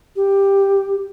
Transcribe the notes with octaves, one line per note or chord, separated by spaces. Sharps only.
G4